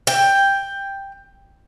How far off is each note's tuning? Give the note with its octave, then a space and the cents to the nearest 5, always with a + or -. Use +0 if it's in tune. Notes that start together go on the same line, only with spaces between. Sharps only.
G5 +10